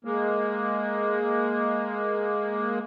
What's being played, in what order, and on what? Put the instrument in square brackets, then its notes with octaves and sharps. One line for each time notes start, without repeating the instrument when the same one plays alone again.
[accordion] G#3 A#3